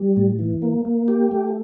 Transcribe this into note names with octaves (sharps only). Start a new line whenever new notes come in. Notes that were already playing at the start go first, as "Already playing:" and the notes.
Already playing: G3
A2
E3
A#3
A#3
G4
A3